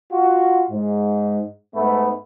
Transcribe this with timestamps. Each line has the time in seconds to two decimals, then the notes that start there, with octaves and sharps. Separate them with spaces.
0.12 F4 F#4
0.70 G#2
1.75 G#2 A3 B3 E5 B5